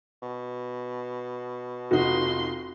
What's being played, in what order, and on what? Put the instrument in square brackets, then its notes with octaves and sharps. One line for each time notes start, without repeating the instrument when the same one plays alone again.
[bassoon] B2
[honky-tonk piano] F1 D#4 [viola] F4 C6 [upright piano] F#4